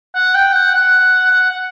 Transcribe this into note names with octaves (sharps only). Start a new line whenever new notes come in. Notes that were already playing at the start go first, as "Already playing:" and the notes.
F#5
G5
F#5
F#5
F#5
F#5